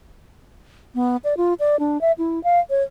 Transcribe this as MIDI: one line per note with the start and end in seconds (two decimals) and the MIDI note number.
0.95 1.17 59
1.24 1.37 74
1.37 1.54 65
1.60 1.79 74
1.79 2.00 62
2.01 2.12 76
2.18 2.42 64
2.44 2.60 77
2.70 2.83 73